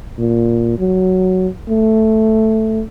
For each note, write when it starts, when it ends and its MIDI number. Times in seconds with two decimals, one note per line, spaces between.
0.18 0.76 46
0.79 1.48 54
1.69 2.83 57